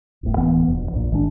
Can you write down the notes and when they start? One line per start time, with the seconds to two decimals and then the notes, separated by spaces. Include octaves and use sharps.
0.23 D1 G1 A2
0.36 D1 E3 A#3 B3
0.68 E1 F2
0.93 A#1 A#2
1.11 G#1 D#3 G#3 D4